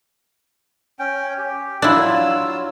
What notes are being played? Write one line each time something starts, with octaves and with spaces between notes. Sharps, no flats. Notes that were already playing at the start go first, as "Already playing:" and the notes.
C#4 G5
G4
F#3 D4 E4 F4 E6